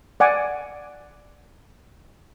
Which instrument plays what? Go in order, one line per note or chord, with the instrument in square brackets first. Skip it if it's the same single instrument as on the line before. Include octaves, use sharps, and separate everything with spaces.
[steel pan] D5 F#5 G#5 D6